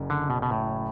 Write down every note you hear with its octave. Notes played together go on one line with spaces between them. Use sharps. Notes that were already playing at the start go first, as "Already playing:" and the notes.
Already playing: F#1 F#2
D3
B2
B2
A2